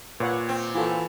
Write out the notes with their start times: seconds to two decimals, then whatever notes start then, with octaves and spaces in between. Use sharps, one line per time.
0.20 A#2 B4 C#5 F#5
0.49 C4
0.75 E3 F4 F#4 A4